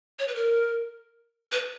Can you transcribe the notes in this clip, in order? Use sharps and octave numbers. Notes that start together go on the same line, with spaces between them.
C#5
B4
A#4
B4